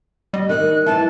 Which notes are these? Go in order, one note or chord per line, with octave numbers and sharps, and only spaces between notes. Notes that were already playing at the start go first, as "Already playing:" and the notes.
G3 D#5
D#3 F#6
E3 A5